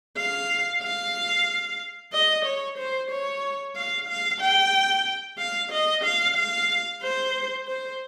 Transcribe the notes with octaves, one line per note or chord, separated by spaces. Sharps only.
F5
F5
D#5
C#5
C5
C#5
F5
F5
G5
F5
D#5
F5
F5
C5
C5